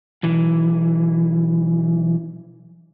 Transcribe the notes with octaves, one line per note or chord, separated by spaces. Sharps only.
B1 E3